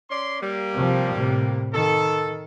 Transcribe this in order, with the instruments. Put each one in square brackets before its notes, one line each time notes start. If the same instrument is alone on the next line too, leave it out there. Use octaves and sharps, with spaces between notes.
[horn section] C#4 D5 C6
G3 A#3
[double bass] C3 F3
A2 C3
[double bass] D#3 [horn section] A4